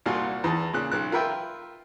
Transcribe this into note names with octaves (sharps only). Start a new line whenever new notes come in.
C2 A#2 F4 F#4
E2 A5
A#2 C#3 F#6
B1 F#6
F4 A#4 B4 E5 G5